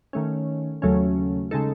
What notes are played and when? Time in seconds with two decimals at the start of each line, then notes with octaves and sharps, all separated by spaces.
0.13 D#3 A3 C#4
0.82 D#2 C#3 F#3 A3 C#4
1.51 C#3 G#3 D#4 A4